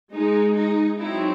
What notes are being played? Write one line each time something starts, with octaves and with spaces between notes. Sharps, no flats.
G#3 D#4
D#4
F#3 C4 D#4 E4